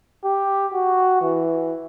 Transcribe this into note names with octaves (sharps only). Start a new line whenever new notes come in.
G4
F#4
E3